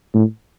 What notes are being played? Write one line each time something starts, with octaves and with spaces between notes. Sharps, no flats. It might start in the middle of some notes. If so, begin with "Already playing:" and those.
A2